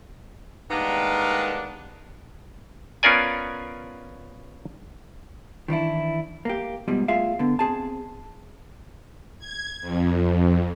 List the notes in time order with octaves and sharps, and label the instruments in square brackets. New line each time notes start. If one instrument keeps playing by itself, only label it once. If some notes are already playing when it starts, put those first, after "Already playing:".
[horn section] D#3 G3 G#3 A#3 B3 D4
[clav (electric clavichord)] B3 C#4 F4 A#4 D5 G#5
[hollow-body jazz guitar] D#3 E3 D4 E4
A#3 G4
G#2 B2 F3 G3 D#4
A3 F4 G#4 E5 F5
D3 B3
C4 G#4 G#5 A5
[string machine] G#6
F2